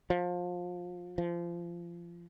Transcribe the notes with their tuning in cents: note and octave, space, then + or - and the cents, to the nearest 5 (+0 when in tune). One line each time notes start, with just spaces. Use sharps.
F3 +25
F3 -25